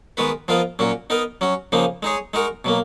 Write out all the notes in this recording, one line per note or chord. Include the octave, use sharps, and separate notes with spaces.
D#3 G#3 B3 F#4 B4
F3 B3 F4 A#4 D#5
A#2 F#3 C#4 F#4
B3 D#4 A#4 D#5
F#3 C#4 F#4
C#3 F3 A#3 D#4
G#3 D#4 G#4 C#5
G#3 D#4 F#4 A#4
B2 F#3 A#3